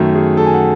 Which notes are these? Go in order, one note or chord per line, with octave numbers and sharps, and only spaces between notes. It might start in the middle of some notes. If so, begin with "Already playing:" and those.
Already playing: F#2 D#3 A3
G#4
A4
G#5
F#5